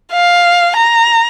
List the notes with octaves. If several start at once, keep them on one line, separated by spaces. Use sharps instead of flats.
F5
A#5